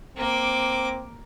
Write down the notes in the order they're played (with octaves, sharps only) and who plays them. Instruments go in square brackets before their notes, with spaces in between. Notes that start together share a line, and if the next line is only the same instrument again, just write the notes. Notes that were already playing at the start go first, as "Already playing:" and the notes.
[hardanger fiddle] A#3 D6 [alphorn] C4